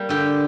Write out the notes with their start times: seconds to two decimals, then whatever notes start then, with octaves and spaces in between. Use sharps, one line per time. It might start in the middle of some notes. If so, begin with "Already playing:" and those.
Already playing: G3 A#3
0.09 D3 G4